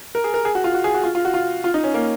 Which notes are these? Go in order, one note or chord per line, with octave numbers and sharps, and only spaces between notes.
A#4
G#4
A#4
G#4
F#4
F4
F#4
G#4
F#4
F4
F4
F#4
F4
F4
D#4
C#4
A#3